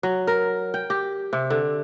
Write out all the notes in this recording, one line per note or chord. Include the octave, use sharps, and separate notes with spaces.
F#3
A#4
G5
G4
C3
D3